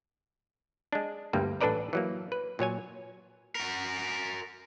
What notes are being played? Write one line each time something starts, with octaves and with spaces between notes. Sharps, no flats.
G#3 D4
G1 D2 G2 G3 A#3
A1 D4 A4 B4 D5 A#5
E3 F#3 A#3
B4
A#2 F#3 C#5 G#5
F#4 A#4